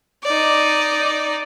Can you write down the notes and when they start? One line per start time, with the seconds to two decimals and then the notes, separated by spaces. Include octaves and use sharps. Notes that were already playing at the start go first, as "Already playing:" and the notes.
0.23 D#4 D5